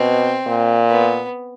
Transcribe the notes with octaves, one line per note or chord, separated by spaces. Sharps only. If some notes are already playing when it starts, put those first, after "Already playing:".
Already playing: B2 C4
A#2
B3